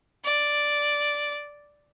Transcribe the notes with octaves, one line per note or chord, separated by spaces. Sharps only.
D5